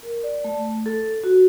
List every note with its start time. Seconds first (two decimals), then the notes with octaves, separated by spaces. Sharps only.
0.03 A#4
0.24 D5
0.44 A3
0.86 A4
1.24 F#4